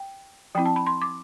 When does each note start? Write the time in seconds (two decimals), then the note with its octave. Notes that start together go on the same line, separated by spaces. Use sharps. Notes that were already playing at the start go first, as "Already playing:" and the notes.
Already playing: G5
0.55 F3 C4 E4 G5
0.65 A5
0.76 B5
0.86 C6
1.02 D6